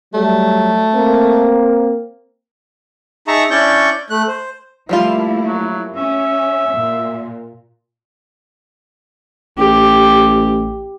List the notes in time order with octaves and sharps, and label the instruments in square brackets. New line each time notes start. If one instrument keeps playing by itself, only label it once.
[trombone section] F#3 G3 [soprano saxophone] A3
[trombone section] A#3 C4
[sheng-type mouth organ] D#4 G#4 E5 A5 A#5 C#6
C#4 D4 E4 D5 C#6 G6
A3 F#6
C5
[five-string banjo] F3 G3 F4 [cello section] A3 A#3 E4
[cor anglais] F#3
[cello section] C#4 [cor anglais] E5
[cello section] A#2
[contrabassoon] A1 [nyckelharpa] G4